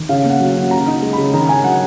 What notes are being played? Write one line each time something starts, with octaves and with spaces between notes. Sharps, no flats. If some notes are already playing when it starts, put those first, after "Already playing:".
Already playing: D#3
C#3 F5
A#3
F#5
F#3
C#3
C#3 A#5
D#4
G#3
B5
C#3
D#3 A#5
C#4 G#5
F#3 F#5